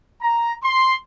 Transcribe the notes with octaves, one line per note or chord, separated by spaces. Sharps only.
A#5
C6